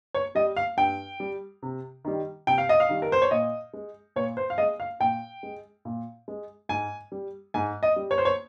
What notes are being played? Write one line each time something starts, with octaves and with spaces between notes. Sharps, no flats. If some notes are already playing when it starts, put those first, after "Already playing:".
C#5
G3 D#5
F5
G2 G5
G3
C3
D#3 G3
C3 G5
F5
D#5
F5
D#3 G3
A#4
C5
C#5
A#2 D#5
G#3
A#2 C#5
C5
F5
G#3 D#5
F5
A#2 G5
G#3
A#2
G#3
G#2 G#5
G3
G#2 G#5
D#5
G3
C#5
C5
C#5